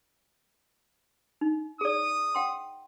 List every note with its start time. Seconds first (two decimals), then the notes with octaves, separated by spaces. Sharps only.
1.41 D#4
1.81 G#4 D5 D#6
2.35 F#5 G5 C6